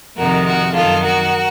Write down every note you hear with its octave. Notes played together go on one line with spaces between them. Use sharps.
F2 C3 D#3 F#4 A#4
F#4 A#4
F#2 D#3 F4 A4
F#4 A#4